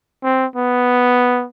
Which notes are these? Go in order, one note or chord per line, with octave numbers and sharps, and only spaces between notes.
C4
B3